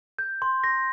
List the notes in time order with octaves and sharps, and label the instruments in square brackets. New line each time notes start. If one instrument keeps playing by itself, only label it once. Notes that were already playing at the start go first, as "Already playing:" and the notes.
[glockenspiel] G6
C6
A#6